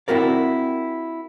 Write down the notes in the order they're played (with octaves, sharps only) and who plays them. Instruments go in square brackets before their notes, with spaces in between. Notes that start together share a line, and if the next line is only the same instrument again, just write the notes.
[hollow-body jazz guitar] C4 E4 F#4 A#4 D5